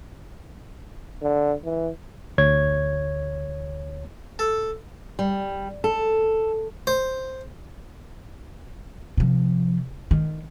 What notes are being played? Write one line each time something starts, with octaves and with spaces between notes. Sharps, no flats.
D3
E3
D2 C#5 G#6
A4
G3
A4
C5
C3 F3
D#3